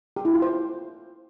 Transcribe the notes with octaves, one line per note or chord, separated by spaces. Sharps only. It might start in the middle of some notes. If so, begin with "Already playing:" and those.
G4
E4
F4
C5